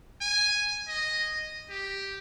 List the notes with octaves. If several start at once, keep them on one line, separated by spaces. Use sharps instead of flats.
G#5
D#5
G4